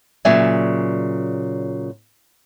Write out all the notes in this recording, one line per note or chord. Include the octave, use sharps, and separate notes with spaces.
A#2 C#3 F#3 D5 E5 G#5